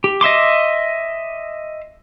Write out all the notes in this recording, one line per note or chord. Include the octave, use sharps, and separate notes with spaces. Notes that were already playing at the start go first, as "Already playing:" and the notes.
G4
D#5 E5 C6 D6